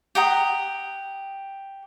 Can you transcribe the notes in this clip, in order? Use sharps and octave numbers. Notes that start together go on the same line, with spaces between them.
G4 F#5 A#5 D#6